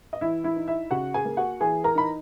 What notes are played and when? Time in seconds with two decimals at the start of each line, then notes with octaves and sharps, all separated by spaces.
0.13 D#5
0.21 E3 E4 E5
0.44 E4 E5
0.56 D#4
0.67 E4 E5
0.91 C#3 F#4 F#5
1.14 G#4 G#5
1.25 A#3
1.37 F#4 F#5
1.61 E3 G#4 G#5
1.84 A#4 A#5
1.95 D#4 B5